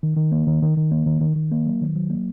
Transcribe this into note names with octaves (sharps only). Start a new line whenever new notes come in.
D#3
D#3
A#3
D#3
D#3
D#3
A#3
D#3
D#3
D#3
A#3
F#3
D#3
F#3
A#3